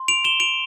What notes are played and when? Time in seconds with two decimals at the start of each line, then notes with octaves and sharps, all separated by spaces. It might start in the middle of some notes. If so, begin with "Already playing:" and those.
Already playing: C6
0.08 D7 F7
0.24 E7 G7
0.40 D7 F7